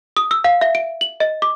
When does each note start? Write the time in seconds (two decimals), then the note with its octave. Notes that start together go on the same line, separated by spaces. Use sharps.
0.17 D#6
0.31 E6
0.44 F5
0.61 E5
0.75 D7
1.01 F#7
1.20 D#5
1.42 D6